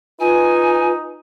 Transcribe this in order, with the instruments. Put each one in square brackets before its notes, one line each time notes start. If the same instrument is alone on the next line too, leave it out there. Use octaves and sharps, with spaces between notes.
[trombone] D#4 [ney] F4 [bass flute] B4 [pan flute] G#5